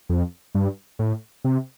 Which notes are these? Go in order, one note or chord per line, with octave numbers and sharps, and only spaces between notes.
F2
G2
A2
C3